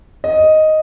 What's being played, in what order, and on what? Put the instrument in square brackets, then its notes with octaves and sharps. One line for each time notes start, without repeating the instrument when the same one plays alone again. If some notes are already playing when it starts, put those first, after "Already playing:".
[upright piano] D#5